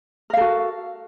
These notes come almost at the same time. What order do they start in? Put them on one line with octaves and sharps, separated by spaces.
A#4 F5 A4 F#4